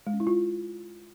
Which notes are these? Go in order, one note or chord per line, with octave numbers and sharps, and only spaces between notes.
G#3
C#4
E4
F4